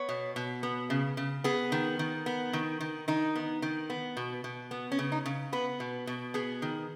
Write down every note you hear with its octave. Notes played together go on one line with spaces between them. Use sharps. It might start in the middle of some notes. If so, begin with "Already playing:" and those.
Already playing: B3 C#5
B2
B2
B3
C#3
C#3
B3 G#4
D#3
D#3
B3
D#3
D#3
D#3 D#4
B3
D#3
B3
B2
B2
B3
C#4
C#3
D#4
C#3
B3 B4
B2
B2
B3 G#4
D#3